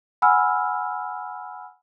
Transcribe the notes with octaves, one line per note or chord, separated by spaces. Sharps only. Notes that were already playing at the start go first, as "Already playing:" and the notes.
F#5 G#5 B5 E6 F6